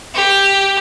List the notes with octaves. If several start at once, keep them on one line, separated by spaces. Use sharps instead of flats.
G4